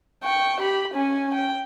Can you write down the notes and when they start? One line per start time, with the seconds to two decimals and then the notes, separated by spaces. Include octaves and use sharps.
0.23 G5 C#6
0.61 G4 B5
0.94 C#4 G#5
1.35 G5